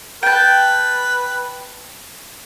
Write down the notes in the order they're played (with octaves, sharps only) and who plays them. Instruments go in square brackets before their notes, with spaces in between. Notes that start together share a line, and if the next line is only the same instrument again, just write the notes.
[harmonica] B4 [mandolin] G5 A5